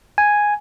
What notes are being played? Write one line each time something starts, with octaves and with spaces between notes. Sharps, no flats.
G#5